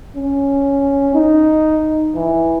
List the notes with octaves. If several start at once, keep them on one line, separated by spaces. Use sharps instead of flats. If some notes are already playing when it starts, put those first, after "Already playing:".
C#4
D#4
E3